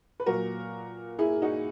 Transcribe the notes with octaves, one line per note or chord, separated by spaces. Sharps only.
B4
A#2 F#3 F#4 A#4
E4 G#4
D#4 F#4